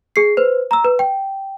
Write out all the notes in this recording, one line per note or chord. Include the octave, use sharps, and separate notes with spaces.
G#4 C7
B4 C5
A#5 E6
B4
G5